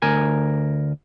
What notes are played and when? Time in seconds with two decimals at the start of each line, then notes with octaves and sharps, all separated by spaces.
0.02 D2 A#4 G#5